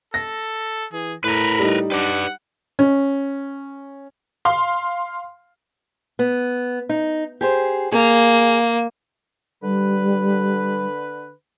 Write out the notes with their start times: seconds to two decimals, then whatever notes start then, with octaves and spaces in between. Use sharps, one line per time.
0.14 A4 A#6
0.93 E3 G#4
1.24 A2 A#4 B4 B5
1.59 G3 D#4
1.92 D4 B4 D5 F#5
2.79 C#4
4.45 F5 C6
6.19 B3
6.89 D#4
7.41 G4 G#4 C5
7.92 A#3 G#4
9.63 D3 G3 B4